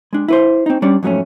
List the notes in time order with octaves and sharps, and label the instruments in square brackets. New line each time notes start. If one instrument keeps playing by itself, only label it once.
[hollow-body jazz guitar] G#3 D4
E4 B4 C5
C4 D#4
G3 C#4 D4 D5
F2 G#2 F#3 G#3 A3 C#4